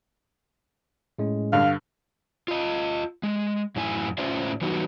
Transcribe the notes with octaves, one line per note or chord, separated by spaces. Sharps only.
A2 G#3 C#4
G2 D3 F5
F4 D#5
G#3
F#2 A2 E4 G#5
A2 C#4 F4 C5 D5 E5
E3 F#3 G3 B3 D#4 F#4